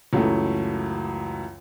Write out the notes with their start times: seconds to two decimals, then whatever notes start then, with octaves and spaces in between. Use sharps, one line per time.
0.13 C#2 F#2 E3 A3